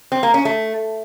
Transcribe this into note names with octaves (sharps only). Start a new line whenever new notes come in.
C4
A#3
C#4
A3